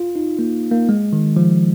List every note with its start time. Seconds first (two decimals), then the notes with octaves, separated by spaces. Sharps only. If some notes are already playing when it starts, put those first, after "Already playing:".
Already playing: F4
0.16 D#4
0.39 A#3
0.71 A#3
0.89 G#3
1.13 D#3
1.36 F3